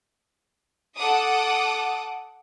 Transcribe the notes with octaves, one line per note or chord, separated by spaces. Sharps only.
A4 F#5 D6 D#6